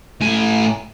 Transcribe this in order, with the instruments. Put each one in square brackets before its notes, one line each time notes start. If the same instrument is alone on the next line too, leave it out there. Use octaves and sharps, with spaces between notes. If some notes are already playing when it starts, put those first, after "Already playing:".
[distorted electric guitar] A2 G#5